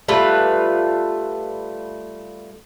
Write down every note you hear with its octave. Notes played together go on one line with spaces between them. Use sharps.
G3 A3 F4 B4